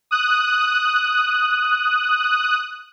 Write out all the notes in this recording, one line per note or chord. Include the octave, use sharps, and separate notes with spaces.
D#6 F#6